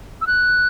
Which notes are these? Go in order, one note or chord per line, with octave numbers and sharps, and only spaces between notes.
E6
F#6